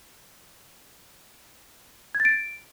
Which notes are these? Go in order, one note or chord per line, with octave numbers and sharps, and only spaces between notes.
G#6
A6
D7